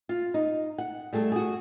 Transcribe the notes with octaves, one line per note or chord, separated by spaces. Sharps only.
F4
D#4
F#5
G3 A3 G#4 A4
F#4 G#4